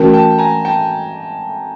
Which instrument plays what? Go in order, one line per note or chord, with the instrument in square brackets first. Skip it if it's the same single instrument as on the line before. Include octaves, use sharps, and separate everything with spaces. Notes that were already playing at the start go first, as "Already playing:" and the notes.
Already playing: [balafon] E3 A3 C#4 F#4 A#4 [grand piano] G5 A5
[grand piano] G5 A5
G#5 A#5
G5 A5